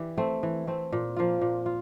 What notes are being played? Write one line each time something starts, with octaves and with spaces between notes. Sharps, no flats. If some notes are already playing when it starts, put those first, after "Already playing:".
Already playing: E3 G4 D5
A3 C4
E3
A3 C4
A#2
F3 A#3 F4
A#2
F4